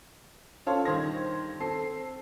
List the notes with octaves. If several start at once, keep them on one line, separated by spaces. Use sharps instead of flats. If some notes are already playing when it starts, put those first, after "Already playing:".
C#4 F4 A4 C5 C#5 F5
G2 D#3 C5 G#6 A#6
C4 A4 C7